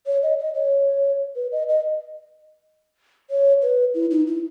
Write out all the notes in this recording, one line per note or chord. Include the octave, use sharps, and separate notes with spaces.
C#5
D#5
D#5
C#5
B4
D#5
D#5
C#5
B4
E4
D#4
E4